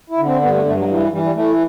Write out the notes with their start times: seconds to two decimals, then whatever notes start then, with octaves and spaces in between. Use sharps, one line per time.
0.10 E4
0.18 D3
0.26 C4
0.41 G2 B3
0.53 A3
0.65 G2 A3
0.77 F#3
0.88 E3 F#3
1.00 G3
1.12 E3 G3
1.23 G3
1.35 E3 A3